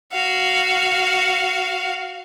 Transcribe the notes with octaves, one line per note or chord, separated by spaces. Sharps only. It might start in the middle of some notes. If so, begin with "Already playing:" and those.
F#4 F5